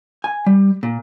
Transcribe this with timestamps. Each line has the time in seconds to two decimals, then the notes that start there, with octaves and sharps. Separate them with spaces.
0.24 G#5
0.46 G3
0.83 A#2